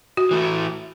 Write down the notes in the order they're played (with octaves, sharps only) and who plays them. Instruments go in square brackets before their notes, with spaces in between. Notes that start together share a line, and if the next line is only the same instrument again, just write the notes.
[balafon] F#4
[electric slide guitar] E3 A3 E4